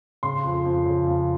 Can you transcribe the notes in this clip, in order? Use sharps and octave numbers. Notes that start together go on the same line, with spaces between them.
C#3 C6
F2
F2
C#3
F2